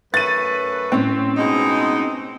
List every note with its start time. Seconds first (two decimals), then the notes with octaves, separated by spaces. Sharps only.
0.14 F#2 A3 B4 A6 D#7
0.92 A2 C4 C#4
1.37 B2 G#3 D#4